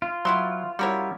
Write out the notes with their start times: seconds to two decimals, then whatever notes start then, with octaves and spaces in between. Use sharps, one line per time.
0.02 F4
0.25 F#3 B3 E4 C#5 C6
0.79 G3 C#4 E4 F#4 A#4 C#5